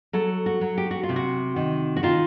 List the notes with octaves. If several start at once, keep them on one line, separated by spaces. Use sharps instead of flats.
F#3 A4
F#4
F#3
G4
F#4
F4
C3
F#4
D#3
F#4
D#3 F4